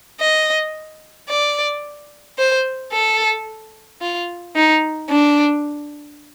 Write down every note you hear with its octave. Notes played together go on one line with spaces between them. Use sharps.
D#5
D5
C5
A4
F4
D#4
D4